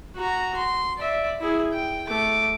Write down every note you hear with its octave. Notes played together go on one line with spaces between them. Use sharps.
F#4 A#5
C6
D5 E5
E4 G#4
G5
A3 D6